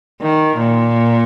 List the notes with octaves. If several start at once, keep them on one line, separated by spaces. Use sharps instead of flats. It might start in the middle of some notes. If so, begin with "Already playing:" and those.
D#3
A#2